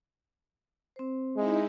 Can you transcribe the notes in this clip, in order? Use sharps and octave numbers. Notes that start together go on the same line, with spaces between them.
C4 C5
G#3 D#4 E4